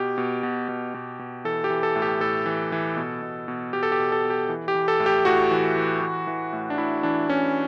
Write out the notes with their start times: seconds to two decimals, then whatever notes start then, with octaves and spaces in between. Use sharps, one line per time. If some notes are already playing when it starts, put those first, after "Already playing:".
Already playing: B2 G4
0.18 B2
0.43 B2
0.69 B2
0.94 B2
1.19 B2
1.45 E3 A4
1.64 G4
1.70 E3
1.83 A4
1.96 A2
2.02 G4
2.20 A2 A4
2.46 E3
2.72 E3
2.97 B2
3.22 B2
3.48 B2
3.73 B2 G4
3.83 A4
3.92 G4
3.99 B2
4.12 A4
4.24 B2
4.30 G4
4.49 E3
4.68 G4
4.74 E3
4.88 A4
5.00 A2
5.06 G4
5.25 A2 F#4
5.51 E3
5.76 E3
6.01 E3
6.27 E3
6.53 A2
6.70 D4
6.78 A2 E4
7.03 E3 D4
7.28 E3 C#4